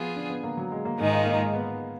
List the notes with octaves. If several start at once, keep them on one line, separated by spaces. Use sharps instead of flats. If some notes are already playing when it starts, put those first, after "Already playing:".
Already playing: F3 B3 F4 G#4
D4
B3
A#3
F#3
G#3
A#3
G#2 D#3 G#3 D#4
F4
A#3
G#3
B3